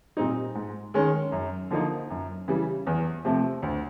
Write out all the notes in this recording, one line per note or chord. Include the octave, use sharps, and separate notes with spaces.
A#2 G3 C4 D#4
G#2
D#3 G#3 C#4
F#2
D3 F3 A#3 D#4
F#2
C#3 E3 G3
E2
C3 F3 A3
D2